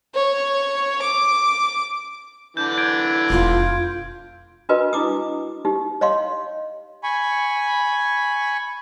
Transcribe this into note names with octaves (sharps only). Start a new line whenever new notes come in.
C#5
D6
D3 E3 D4 G6
G6 G#6 D7
E1 F2 F4
D4 F4 F#4 A#4 B4 D#5
D4 E4 D6 D#6
D#4 G4
C#5 D#5 F5 C6
G#5 B5 C#6